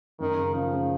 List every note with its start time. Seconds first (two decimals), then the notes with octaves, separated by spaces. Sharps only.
0.20 F#2 D#3
0.37 C#3
0.55 C#3 F3
0.72 C#3